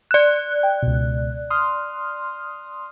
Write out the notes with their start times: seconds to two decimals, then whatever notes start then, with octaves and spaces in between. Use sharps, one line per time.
0.11 D5 F#6
0.63 G5
0.82 C#2 B2
1.50 C6 D#6 F6